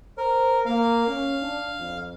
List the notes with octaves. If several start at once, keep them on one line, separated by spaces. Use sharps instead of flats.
A#4 C5
A#3 F5
C#4
D4
F2